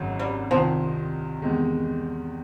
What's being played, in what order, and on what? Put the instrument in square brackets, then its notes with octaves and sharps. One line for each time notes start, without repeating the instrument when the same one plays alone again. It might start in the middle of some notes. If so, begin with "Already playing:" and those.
Already playing: [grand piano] G#1 F#2 C#3 F#3
[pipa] G3
[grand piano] C2 C3 D#3 [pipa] F3
[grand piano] E2 C3 D#3 G#3